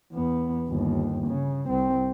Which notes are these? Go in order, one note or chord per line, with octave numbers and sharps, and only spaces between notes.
E2 B3
G1 D#2
C#3
C2 C4